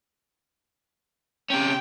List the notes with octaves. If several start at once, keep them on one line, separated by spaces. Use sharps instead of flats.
C3 C#4 G5